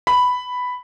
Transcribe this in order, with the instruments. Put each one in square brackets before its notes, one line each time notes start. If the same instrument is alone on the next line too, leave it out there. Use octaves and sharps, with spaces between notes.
[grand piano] B5